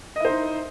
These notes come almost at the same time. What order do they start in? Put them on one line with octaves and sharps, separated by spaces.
D#5 E4 C5 D#4